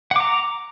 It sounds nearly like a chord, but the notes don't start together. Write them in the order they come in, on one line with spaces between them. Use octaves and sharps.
F#5 D6 A#5